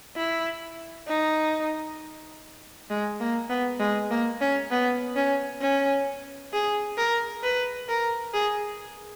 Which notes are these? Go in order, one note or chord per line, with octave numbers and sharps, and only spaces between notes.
E4
D#4
G#3
A#3
B3
G#3
A#3
C#4
B3
C#4
C#4
G#4
A#4
B4
A#4
G#4